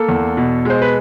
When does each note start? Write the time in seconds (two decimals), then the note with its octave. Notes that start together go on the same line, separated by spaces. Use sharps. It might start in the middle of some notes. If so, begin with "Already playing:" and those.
Already playing: A#3 A4
0.09 E2
0.37 B2
0.65 G#3 C5
0.82 B4